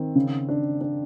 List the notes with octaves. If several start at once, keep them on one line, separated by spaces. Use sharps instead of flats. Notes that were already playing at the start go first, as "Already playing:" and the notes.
Already playing: D#3 C4
C#3
D4
D4